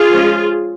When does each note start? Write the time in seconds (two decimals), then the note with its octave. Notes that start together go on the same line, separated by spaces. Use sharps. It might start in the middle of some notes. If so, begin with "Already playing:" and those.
Already playing: F4 G#4
0.11 F3 G#3 C#4